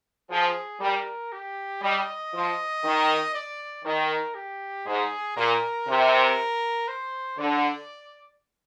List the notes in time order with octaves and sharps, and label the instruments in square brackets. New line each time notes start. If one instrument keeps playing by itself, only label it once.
[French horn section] F3 [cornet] G#4
[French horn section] G3 [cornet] A#4
[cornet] G4
[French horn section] G3 [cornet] D#5
[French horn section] F3
D#3
[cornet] D5
[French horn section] D#3 [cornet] A#4
[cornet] G4
[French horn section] G#2 [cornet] G#4
[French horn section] A#2 [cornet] A#4
[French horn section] C3
[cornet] C5
[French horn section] D3 [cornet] D5